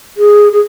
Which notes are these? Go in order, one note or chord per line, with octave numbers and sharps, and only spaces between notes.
G#4
G#4